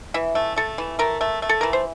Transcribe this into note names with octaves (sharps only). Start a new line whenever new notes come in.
E3 E5
A3
A3 A4
E3
A3 A#4
A3
A3
A4
E3 A#4
C5